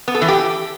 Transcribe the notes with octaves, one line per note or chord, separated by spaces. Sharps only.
B3
A4
E3
G4